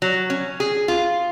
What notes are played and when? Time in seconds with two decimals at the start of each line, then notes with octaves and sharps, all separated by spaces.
0.02 F#3
0.30 C#4
0.60 G#4
0.88 F4